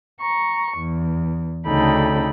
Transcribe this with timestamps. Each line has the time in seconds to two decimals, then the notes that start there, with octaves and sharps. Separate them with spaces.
0.21 A#5 C#6
0.78 E2
1.67 D2 C#3 D#4 A4 G5 B5